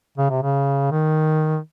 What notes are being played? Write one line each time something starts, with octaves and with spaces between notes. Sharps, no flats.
C#3
C3
C#3
D#3